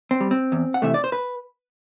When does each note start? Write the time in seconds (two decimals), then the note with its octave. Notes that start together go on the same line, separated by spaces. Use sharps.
0.11 C4
0.21 G3
0.31 C4
0.52 E2
0.74 F#5
0.82 C3 E3 A3 E5
0.94 D5
1.04 C5
1.12 B4